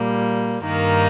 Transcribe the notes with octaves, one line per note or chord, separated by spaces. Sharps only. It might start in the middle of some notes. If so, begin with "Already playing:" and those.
Already playing: A#2 G3 A#3
G2 D#3 A#3 D#4